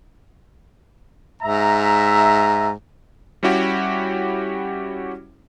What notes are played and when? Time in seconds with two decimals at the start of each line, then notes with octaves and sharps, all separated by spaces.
1.42 G#2 E5 A#5
3.43 G3 C#4 E4 F#4 G4